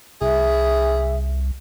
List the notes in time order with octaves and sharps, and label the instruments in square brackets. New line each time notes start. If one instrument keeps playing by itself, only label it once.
[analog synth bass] C2 [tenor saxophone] G#4 [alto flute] E5